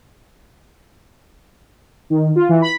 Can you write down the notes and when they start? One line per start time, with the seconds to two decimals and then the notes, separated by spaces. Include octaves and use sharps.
2.10 D#3
2.36 F4
2.49 E3
2.62 B5